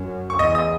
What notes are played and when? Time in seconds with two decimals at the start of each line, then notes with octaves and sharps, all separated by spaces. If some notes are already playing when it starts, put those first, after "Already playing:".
Already playing: F#2
0.30 C#6
0.39 E2 D#5 D#6
0.55 D#5 D#6